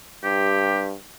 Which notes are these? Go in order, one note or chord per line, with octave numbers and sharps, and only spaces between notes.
G2 G4